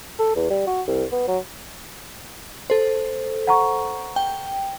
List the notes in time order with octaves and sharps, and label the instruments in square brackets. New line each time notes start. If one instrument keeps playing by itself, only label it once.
[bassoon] A4
E2
G3
F#4
C2
B3
F#3
[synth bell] A4 C5
[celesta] F#5 A#5 C#6
[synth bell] G5